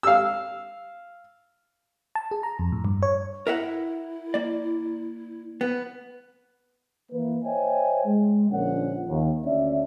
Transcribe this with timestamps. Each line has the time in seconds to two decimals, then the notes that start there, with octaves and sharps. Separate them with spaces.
0.03 F5 E6
2.15 A5
2.31 G#4
2.43 A#5
2.59 F2
2.72 A2
2.85 G2
3.03 C#5
3.47 E4 A#4 E5 F#5
4.34 A#3 D5
5.61 B3
7.12 E3 A#3 E4 B4
7.44 C5 C#5 D#5 E5 G5 G#5
8.05 G#3
8.50 A#1 D3 C#4 F4 A#4 F#5
9.08 D#2
9.44 D2 C#4 D4 D5 E5